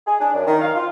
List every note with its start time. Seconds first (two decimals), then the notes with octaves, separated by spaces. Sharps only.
0.07 G#4
0.20 D4
0.34 F#2
0.47 D#3
0.61 F5
0.76 F4